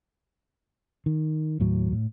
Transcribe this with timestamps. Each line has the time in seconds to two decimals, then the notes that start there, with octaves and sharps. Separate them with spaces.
1.06 D#3
1.60 D#2 A2 F#3
1.92 A2